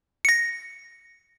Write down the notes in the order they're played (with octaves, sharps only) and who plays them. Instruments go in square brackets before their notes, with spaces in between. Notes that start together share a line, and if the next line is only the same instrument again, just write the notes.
[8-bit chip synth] A#6 C#7